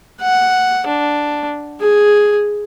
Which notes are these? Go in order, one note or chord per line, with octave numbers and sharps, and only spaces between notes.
F#5
D4
G#4